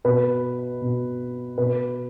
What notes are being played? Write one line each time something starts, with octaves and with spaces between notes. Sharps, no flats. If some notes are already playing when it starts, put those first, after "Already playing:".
B2 B4
B2
B2 B4